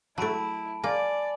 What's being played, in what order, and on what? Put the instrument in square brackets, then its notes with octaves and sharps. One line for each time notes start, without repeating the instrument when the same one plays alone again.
[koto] F#3 A3 [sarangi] E4 [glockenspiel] A5 B5 D7
[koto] A#3 [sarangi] D5 [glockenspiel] G#5